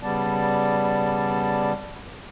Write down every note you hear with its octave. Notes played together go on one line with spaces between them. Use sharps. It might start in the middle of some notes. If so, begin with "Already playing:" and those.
C#3 G3 B3 D5 A5